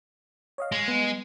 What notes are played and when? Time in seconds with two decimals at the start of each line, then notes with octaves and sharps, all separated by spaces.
0.58 C#5 D#5 F5
0.72 G#3
0.88 B3